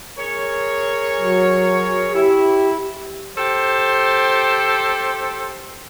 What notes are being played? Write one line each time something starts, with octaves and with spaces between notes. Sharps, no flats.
G#4 A#4 C#5
F#3
E4 G4
G4 A4 C5